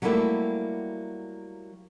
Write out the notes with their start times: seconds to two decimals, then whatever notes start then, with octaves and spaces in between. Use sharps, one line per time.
0.02 F#3 G3 A3 A#3 E4 G4